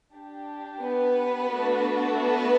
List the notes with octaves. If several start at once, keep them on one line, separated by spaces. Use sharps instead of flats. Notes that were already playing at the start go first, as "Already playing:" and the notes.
D4 G4
B3 B4
A3 D4 F#4 A4
B3 B4